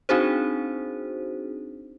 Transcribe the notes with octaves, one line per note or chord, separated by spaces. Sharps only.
C4 D4 D#4 F#4 G#4 C5